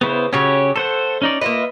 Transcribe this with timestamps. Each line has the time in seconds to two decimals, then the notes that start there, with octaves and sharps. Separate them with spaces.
0.01 C#3 B3 E4 C5
0.33 C#3 F#3 C#4 G4 C#5
0.76 A3 A4 C5 F#5
1.22 C#4 D#4 D5
1.41 A#3 F4 B4 D#5 E5